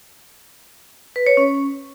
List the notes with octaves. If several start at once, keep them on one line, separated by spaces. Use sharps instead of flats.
B4
C#5
C#4